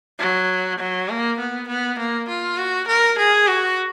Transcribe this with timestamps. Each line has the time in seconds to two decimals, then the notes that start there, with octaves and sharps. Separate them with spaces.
0.19 F#3
0.79 F#3
1.09 A#3
1.39 B3
1.68 B3
1.99 A#3
2.29 F4
2.57 F#4
2.88 A#4
3.18 G#4
3.47 F#4